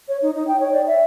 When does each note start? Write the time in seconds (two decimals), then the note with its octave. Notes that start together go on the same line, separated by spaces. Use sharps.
0.08 C#5
0.22 D#4
0.35 D#4
0.48 G5
0.60 C#5
0.73 D5
0.87 E5